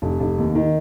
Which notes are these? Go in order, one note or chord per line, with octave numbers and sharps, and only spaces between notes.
F1
F1
D#2
D#3